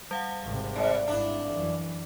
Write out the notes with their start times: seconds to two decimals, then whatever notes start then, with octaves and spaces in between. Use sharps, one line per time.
0.11 G3 F5 F#5
0.42 G#1 C3
0.75 G#2 D5 E5
1.07 G#1 D4 E4
1.47 F#2 E3